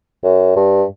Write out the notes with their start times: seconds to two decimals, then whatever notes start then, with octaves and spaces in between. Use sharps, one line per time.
0.24 F#2
0.56 G2